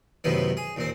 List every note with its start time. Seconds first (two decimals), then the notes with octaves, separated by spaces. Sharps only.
0.24 F#2 A2 C3 D#3 B3
0.57 G#4
0.76 D#2 A#2 C4